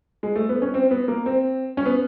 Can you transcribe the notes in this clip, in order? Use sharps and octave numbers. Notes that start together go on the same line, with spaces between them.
G#3
A3
B3
C#4
C4
B3
A#3
C4
C#4
B3